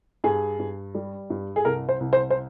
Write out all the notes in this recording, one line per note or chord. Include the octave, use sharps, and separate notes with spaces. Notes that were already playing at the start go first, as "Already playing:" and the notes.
G2 G#4
G2
G3
G2
G#4
C2 A#4
C5
C2
C5
C5